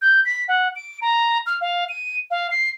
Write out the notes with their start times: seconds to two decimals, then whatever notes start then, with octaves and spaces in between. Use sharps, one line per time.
0.02 G6
0.25 B6
0.48 F#5
0.76 D7
1.02 A#5
1.46 F6
1.61 F5
1.89 D#7
2.31 F5
2.51 C7